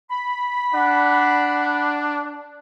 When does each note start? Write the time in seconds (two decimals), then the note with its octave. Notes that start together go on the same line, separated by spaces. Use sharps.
0.10 B5
0.75 D4 F#5